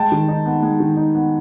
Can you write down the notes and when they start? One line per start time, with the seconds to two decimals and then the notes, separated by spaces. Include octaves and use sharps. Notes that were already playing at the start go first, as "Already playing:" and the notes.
Already playing: G#3 G5 A5
0.12 D#3
0.28 D#4
0.46 B3
0.63 G#3
0.80 D#3
0.97 D#4
1.15 B3